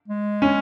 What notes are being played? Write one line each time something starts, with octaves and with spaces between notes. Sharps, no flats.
G#3
C#4